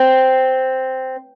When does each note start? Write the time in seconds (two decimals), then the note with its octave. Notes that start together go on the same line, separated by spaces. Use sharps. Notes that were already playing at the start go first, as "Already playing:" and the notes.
Already playing: C4